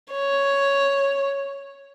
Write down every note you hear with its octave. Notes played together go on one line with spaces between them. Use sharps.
C#5